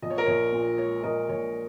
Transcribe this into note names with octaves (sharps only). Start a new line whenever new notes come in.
A#1 D#5
C#5
A#4
A#1 C#5
A#2
G#3 C#5
A#1 A#4 D#5
A#1 C#5